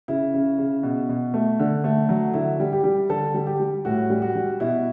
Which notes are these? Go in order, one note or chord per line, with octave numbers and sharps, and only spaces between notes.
C#3 E4
C#3
C#3
B2
B2
A3
D3
A3
F#3
D3 E4
G3
G4
G3
D3 A4
G3
G4
G3
A2 F#4
G3
F#4
G3
B2 E4